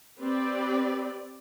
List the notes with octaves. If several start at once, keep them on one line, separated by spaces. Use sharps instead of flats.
C4 G4 B4 D5